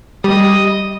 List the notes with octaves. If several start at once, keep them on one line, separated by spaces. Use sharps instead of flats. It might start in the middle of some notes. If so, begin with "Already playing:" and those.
G3 D#5 D#6